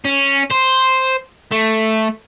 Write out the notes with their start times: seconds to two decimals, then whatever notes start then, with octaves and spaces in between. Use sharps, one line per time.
0.05 C#4
0.51 C5
1.52 A3